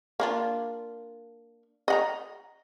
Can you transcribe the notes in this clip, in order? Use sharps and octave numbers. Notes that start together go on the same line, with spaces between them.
A#3 D4 F4
D#5 F#5 A#5